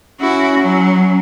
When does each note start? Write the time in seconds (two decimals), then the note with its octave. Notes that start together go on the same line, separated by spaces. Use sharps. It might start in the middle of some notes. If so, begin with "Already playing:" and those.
0.20 C#4 E4 F#4
0.59 F#3